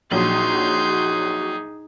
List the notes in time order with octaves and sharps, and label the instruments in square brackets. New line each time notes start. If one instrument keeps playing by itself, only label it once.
[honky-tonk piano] A#1 A#2 F#3 [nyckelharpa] D#4 G#4 [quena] F#4 [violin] C6 G6